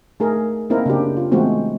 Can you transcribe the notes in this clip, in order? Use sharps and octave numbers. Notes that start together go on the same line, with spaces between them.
A3 D#4 G#4 A#4
A#3 C4 D#4 E4 A#4 C5
C#3 D4 F#4 G4
F4
E3 G#3 A3 B3 C4 F#4